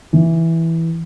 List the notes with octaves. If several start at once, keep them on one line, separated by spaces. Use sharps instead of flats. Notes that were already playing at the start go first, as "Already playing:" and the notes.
E3